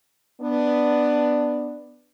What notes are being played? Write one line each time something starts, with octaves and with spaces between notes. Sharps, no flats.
B3 D4